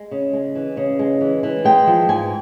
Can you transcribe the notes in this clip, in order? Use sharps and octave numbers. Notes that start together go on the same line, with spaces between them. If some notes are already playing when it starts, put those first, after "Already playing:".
Already playing: G#3
C#3
G#3
E3
C#3
G#3
E3
E3
G#3 G5
F3
G#2 G#5